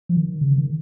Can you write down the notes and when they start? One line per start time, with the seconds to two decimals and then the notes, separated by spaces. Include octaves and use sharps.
0.09 F3
0.17 D#3
0.41 C#3
0.58 D#3